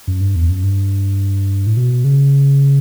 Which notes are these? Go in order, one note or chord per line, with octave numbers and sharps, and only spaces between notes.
F#2
G2
E2
F#2
G2
A2
B2
C#3